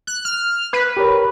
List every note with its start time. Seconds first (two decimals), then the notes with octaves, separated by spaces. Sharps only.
0.07 F#6
0.25 F6
0.73 B4
0.97 G4 A#4 C#5